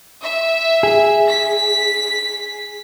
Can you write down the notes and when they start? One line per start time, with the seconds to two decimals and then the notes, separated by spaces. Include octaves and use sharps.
0.23 E5
0.83 G#4
1.28 B6